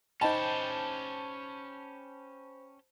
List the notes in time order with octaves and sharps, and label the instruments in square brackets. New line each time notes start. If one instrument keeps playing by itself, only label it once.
[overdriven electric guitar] C#4 G4 [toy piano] D#4 D#5 G5 [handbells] C5 B5 [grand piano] A5